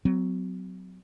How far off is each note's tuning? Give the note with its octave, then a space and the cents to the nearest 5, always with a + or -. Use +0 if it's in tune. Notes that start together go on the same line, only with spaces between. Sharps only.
F#3 +0 C4 -45